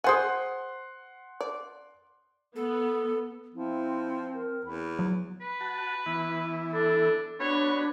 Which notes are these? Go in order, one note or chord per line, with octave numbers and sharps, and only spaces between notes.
G#4 C5 F#5 G#5 C6
D5
B3 A4
F3 C4 E4
A#4
E2 B5
F#3
B4
F#4 A5
E3 B3 E4
D4 A4
B3 D4 F#4 B4 C#5